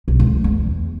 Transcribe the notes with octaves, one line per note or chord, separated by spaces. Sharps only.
B1
D2
E2